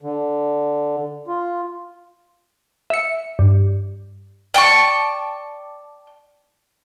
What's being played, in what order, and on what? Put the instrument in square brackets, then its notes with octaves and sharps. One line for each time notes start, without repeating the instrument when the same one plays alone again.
[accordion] D3
F4
[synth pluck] E5 C#7
G2
[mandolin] D5 G5 A5 C#6